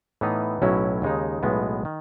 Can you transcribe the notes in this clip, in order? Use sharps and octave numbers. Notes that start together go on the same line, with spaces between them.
A2 E3 B3 D#4
B1 A2 F#3 C#4 E4
D#2 C#3 G#3 D#4
B1 A2 G#3 B3
D#3